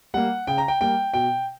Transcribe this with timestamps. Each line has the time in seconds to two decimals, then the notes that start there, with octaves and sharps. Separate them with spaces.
0.14 G3 A#3 F#5
0.47 C#3 G5
0.58 A#5
0.68 G5
0.81 G3 A#3 G5
1.13 B2 G5